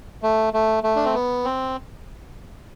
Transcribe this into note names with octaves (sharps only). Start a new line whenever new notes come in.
A3
A3
A3
D4
C4
B3
C4